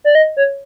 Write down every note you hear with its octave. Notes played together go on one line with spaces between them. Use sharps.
D5
D#5
C#5